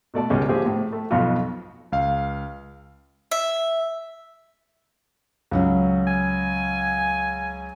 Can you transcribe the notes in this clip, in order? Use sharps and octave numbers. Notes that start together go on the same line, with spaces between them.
B2 A3 D5 A5
C#2 B2 G3 G#3 C#4 G4
A#2 D3 F3 C4 G4 G#4
A2
A3
B1 F2 B2 F3 F4 F#4
C#2 F5
E5
C#2 F#3 C#4
G#5